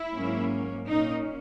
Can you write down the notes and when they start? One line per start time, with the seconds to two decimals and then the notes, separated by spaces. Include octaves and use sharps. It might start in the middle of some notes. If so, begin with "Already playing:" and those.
Already playing: E4
0.12 G#2 F#3 A#3 C#4
0.87 A#2 A#3 C#4 D#4